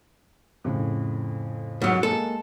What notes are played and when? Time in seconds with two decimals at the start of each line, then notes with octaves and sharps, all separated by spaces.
0.64 F2 A2 C#3
1.82 G#2 F#3
2.03 G#3 A#3 A4